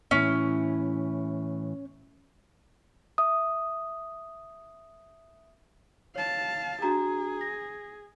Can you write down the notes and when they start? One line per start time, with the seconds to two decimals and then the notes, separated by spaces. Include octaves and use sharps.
0.11 A2 E3 C#4 E4
3.18 E5 D#6
6.16 C#5 F5 A5
6.82 D4 F#4 G#4 A#5
7.41 A#6